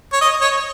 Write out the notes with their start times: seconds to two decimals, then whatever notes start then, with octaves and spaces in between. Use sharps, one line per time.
0.13 C#5
0.21 D#5
0.41 C#5